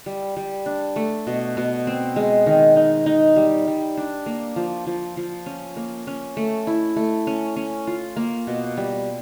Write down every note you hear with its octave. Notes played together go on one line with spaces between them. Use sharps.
G3
G3
D4
A3
B2
B2
C4
G#3
D#3
D#4
D#4
G3
G3
D4
A#3
F3
F3
F3
C#4
A#3
C#4
A3
E4
A3
C#4
C#4
F4
A#3
B2
G3